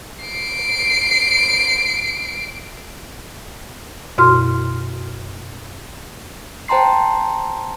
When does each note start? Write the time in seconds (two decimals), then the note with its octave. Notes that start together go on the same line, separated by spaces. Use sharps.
0.25 C7 D7
4.18 F#2 B2 F#4 C6 F6
6.68 C5 G5 A5 A#5 C6 C7